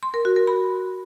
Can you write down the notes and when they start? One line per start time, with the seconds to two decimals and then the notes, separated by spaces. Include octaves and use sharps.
0.03 C6
0.14 A#4
0.25 F#4
0.36 A#4
0.47 B5